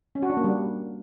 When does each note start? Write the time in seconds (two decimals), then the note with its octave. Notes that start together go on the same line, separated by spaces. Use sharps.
0.15 C#4
0.23 F#4
0.30 D4
0.37 A#3
0.44 G3